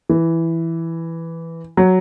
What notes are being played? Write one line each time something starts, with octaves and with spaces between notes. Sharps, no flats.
E3
F#3